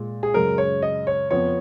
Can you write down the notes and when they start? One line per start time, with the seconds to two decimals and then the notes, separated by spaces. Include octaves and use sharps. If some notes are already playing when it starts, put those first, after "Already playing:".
Already playing: A#2 G#3
0.23 G#4
0.34 F#2 C#3 G#3 A#4
0.58 C#5
0.82 D#5
1.07 C#5
1.31 F2 F3 B3 C#5